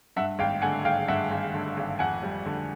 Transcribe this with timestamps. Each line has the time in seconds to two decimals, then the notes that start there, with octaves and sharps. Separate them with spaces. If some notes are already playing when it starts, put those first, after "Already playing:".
0.16 G2 E5 F#5
0.39 G#1 F5 G5
0.62 D3 F#5 G#5
0.85 G#1 F5 G5
1.08 G2 E5 F#5
1.31 G#1
1.54 D3
1.77 G#1
1.99 F2 F#5 G#5
2.23 G3
2.46 D3